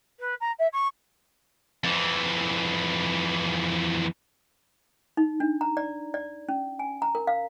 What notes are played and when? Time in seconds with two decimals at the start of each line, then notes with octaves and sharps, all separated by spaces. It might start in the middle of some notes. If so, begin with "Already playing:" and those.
0.19 B4
0.40 A#5
0.58 E5
0.72 C#6
1.84 F2 E3
5.17 D#4
5.40 D4
5.61 A#5
5.77 D5
6.14 D5
6.49 C#4
6.79 G#5
7.02 A#5
7.15 A#4
7.27 F5